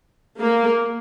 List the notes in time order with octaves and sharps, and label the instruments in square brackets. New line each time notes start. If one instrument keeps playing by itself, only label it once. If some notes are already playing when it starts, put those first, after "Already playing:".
[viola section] A#3